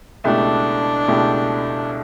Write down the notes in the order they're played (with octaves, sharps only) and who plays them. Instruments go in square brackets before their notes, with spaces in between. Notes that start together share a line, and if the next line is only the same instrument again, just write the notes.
[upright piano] C#2 B2 A3 E4 G4 [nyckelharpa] D4
[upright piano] C#2 B2 A3 E4 G4